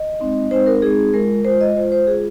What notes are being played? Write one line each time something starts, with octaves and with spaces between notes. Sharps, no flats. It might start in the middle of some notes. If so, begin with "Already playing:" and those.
Already playing: D#5
G#3 C4 D#4
G#3 C4 D#4 C5
A#4
G#3 C4 D#4 G#4
G#3 F4 A#4
G#3 F4 C5
D#5
G#3 F4 C5
C5
G#3 F4 G#4